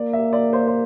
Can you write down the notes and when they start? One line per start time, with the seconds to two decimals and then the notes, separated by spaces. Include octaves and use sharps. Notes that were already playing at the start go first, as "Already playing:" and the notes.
Already playing: A#3 D5
0.13 E5
0.33 D5
0.53 C5
0.60 D5
0.68 C5